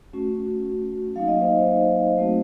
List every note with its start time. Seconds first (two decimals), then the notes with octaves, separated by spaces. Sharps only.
0.13 A3 C#4 F#4
1.16 F#3 A#3 D#4 F5
1.28 D#5
1.41 C5
2.18 A3 C4 D#4 F#4